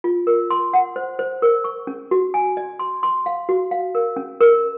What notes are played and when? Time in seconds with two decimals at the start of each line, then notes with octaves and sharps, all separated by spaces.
0.04 F4
0.27 A#4
0.51 C6
0.74 F#5
0.96 C5
1.19 C5
1.42 A#4
1.64 C#6
1.87 C#4
2.11 F#4
2.34 G#5
2.57 D#5
2.79 C6
3.03 C6
3.26 F5
3.49 F#4
3.71 F5
3.95 A#4
4.16 C#4
4.41 A#4